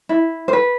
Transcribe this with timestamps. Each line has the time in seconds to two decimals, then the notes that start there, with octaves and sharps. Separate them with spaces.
0.09 E4
0.48 C5
0.53 B4